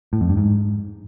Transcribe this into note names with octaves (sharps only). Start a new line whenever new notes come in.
A2
F2
G2
G#2